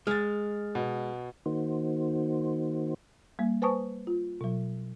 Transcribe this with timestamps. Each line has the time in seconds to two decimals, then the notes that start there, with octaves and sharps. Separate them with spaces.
0.07 G#3 F6 A6
0.75 B2
1.46 D#3 A#3 D#4 F#4 C5
3.39 G3 A#3
3.62 B4 C5 G#5 A5 C#6 D#6
4.07 F4
4.41 B2 F#3